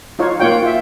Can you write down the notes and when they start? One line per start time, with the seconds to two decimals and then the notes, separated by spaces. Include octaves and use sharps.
0.19 D#4 F4 C#5
0.40 A#3 F4 C#5 F#5 G5
0.63 F4 E5